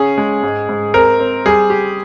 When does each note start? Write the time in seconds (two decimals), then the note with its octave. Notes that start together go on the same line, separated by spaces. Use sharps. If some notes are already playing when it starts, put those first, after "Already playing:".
Already playing: C#3 C#4 G#4
0.18 G#3
0.43 G#2
0.69 G#2
0.94 C4 A#4
1.20 C4
1.46 G3 G#4
1.70 G4